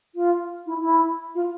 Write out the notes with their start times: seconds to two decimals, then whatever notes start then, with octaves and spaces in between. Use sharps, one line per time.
0.14 F4
0.66 E4
0.81 E4
1.34 F4